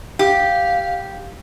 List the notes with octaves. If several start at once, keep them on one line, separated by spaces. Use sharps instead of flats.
G4 F5